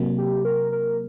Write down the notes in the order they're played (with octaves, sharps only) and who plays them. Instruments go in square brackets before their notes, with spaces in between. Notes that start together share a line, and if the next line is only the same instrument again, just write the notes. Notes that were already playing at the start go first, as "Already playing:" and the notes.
Already playing: [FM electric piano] C3 F#3 A#3
[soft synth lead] G4
A#4
A#4